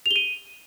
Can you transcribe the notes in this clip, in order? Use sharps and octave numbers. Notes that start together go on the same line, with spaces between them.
F7
G7
D#7